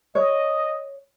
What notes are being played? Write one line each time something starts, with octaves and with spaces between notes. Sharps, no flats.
C#5 D#5